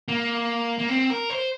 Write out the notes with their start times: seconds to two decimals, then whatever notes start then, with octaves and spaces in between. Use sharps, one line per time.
0.08 A#3
0.79 A#3
0.89 C4
1.10 A#4
1.30 C5